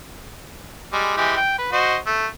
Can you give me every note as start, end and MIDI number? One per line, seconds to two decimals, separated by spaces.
0.93 1.14 55
0.93 1.14 56
1.17 1.36 52
1.17 1.36 56
1.17 1.36 67
1.37 1.55 79
1.58 1.70 71
1.72 1.97 66
1.72 1.97 72
1.72 1.97 75
2.07 2.27 57